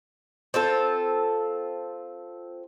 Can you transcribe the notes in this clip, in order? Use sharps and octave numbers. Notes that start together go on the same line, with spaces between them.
C4 F4 A4